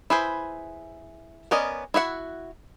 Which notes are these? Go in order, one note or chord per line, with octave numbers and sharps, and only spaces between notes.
E4 G#4 B4 C5
B3 C#4 A#4 D5 D#5
E4 F#4 E5 F#5